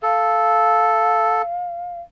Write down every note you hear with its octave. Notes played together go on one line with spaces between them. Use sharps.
A4 F5